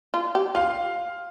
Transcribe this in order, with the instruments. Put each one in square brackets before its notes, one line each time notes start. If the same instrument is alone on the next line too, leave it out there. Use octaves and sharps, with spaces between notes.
[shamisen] F4
G4
[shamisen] F4 [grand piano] F5